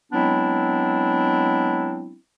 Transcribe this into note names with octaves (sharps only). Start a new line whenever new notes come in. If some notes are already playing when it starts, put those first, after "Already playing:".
F#3 G#3 B3 C4 D4 E4